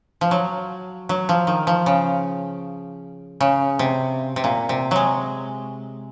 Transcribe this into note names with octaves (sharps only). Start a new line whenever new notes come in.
F3
F#3
F#3
F3
D#3
F3
C#3
C#3
C3
C3
A#2
C3
F#3 G#3